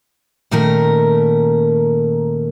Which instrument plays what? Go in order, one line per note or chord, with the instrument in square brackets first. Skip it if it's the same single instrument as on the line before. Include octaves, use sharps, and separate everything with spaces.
[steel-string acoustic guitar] A#2 D#3 A3 C#4 A#4